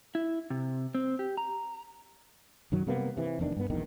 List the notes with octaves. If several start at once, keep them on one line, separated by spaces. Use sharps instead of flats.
E4
C3
C4
G4
A#5
F#2 D#3 F#3
C3 G3 A#3 B3
C3 E3
F1 E2 D#3 D4
G2 B3
A#1 E2 D#3